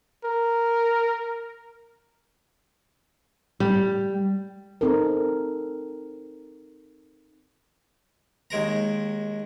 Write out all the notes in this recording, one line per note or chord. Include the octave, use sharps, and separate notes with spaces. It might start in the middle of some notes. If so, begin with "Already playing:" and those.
A#4
G3
C4 D#4 A4 A#4
D#2 G#3 A#4 A#5